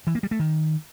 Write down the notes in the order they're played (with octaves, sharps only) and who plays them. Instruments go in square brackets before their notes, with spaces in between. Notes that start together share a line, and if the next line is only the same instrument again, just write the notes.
[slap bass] E3
A#3
G3
A3
D#3